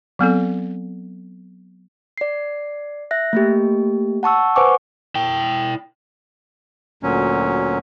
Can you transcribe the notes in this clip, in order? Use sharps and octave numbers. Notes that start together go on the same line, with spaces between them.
F#3 B3 C4 A4
D5 C7
E5 F#6 A#6
A3 A#3 G4
F#5 A5 C#6 E6
B4 C5 F#5 G#5 C#6 D6
E4 G5
D2 A#2 F#3 C#4